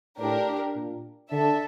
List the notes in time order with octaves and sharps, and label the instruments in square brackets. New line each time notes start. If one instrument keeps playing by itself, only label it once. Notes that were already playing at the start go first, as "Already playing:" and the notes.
[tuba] A2 [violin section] D4 G4 A#4
[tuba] A#2
[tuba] D3 [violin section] D4 A4 E5